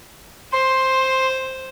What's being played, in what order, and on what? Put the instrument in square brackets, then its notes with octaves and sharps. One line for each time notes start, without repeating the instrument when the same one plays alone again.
[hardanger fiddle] C5 [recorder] C6